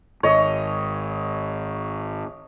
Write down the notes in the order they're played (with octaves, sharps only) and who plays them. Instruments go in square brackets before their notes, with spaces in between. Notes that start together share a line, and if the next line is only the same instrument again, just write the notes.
[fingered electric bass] G#1 [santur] C#5 D#5